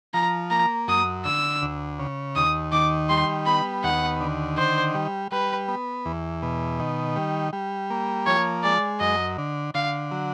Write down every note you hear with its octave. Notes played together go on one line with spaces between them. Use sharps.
F3 A#5
A#3 A#5
F#2 D#6
D3 E6
D2
C#3
D#2 D#6
D#3 D6
G3 C6
B3 B5
D#2 F#5
D3
D#3 C5
G3
G3 B4
B3
E2
B2
D#3
G3
G3
A#3
F3 C#5
G#3 D5
F#2 D#5
D3
D3 F5
F#3